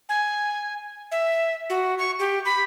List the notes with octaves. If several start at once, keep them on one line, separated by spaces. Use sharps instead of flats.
G#5
E5
F#4
C#6
G4
B5